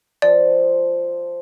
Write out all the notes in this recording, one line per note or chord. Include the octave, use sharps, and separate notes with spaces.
F3 D5